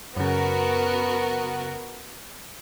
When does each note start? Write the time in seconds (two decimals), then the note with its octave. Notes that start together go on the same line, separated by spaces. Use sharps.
0.16 F#2 C#3 B3 F#4 A#4